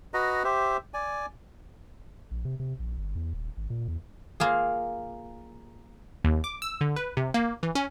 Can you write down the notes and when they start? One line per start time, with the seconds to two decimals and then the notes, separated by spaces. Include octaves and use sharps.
0.14 F#4 B4 D#5 A#5
0.44 G4 C5 E5
0.94 D5 G#5
2.31 A#1
2.45 C3
2.60 C3
2.80 A#1
2.98 G1
3.15 E2
3.34 D#1
3.57 G#1
3.70 A#2
3.88 E2
4.40 A#3 F4 G#4
6.24 D#2
6.44 D6
6.62 E6
6.81 D3
6.96 B4
7.17 C3
7.34 A#3
7.63 E3
7.75 C#4